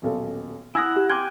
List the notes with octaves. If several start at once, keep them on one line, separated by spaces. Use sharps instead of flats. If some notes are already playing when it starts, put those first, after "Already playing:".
D#1 B1 A4
E4 F#5 G#5 D#6 E6 G#6 A#6
G4
G5 G#5 C6 D6 F6 F#6 G#6